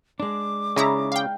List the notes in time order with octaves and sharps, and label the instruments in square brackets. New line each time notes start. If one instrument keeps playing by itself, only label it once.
[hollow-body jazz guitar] G#3 D4 [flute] D6
[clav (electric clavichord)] C#3 [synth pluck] D#4 E4 A#5
[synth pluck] F5 G5